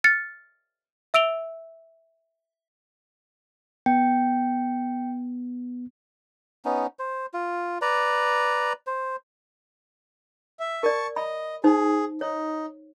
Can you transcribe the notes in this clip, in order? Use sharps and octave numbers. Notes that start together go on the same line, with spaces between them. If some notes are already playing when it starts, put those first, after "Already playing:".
F6 A6 C#7
E5 E6 D7 F7 G7
B3 G5
B3 C#4 D#4
C5
F4
B4 D5 A#5
C5
E5
A#4 D5 A5 C#6
D#5 B5
D#4 G#4 C5
D#4 C#5